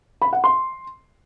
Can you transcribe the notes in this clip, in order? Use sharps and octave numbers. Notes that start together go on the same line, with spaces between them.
B5
F#5
C6